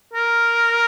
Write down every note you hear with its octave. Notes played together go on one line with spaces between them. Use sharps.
A#4